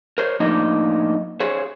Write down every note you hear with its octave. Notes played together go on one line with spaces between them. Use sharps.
A#4 C5 C#5
A2 F3 A#3 D4 D#4 D#5
G#4 C5 C#5